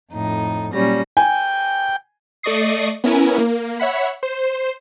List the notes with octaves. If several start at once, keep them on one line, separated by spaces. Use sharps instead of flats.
F2 A2 D#4
A#2 F#3 G3 C#4 A#6
G5 G#5
A3 D5 D#5 C#6 D#6 C7
B3 C#4 E4 A#4 G#5
A#3
C#5 E5 F#5 B5
C5